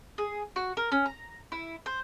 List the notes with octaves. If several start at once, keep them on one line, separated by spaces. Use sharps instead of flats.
G#4
F#4
A#4
C#4
A#5
E4
C5